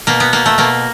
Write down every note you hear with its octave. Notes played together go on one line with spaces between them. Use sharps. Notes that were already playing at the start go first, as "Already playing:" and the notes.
B2 A#3
B3
B2 A#3
A3
B2 A#3